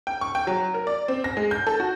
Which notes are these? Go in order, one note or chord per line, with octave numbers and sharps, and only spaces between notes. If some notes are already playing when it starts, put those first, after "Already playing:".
G5
C#6
G5
F#3
A#4
D5
C4
A#6
G#3
G6
A4
F#4